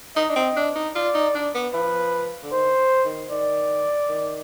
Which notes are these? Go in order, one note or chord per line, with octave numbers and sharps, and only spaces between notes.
D#4 D#5
D4
C4
D4
D#4
F4 D5
D#4
D4
B3
F3 B4
D3
D#3 C5
D#3
D#3 D5
D#3